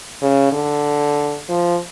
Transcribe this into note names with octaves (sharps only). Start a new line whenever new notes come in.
C#3
D3
F3